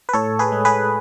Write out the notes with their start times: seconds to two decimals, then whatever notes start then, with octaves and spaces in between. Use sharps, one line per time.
0.09 B4
0.13 A2 A4 C#5
0.39 G#4 B4
0.52 G#3
0.65 G#4 B4